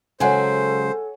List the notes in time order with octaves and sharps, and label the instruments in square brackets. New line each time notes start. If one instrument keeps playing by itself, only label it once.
[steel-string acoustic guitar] C#3 F#3 G#3 [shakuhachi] A4 [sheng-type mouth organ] C5 [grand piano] C#5 F#5 G#5